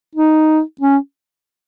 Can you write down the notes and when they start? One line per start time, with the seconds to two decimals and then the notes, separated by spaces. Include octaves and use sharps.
0.16 D#4
0.81 C#4